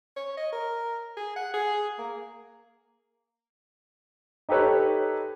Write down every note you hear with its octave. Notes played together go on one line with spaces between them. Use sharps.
C#5
D#5
A#4
G#4
F#5
G#4
A#3
D#4 G4 A4 B4 C#5